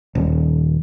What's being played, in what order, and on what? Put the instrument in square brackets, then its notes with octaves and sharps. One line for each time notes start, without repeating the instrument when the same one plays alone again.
[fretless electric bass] D#1